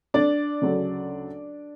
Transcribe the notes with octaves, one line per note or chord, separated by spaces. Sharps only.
D4 D5
D2 C#3 F#3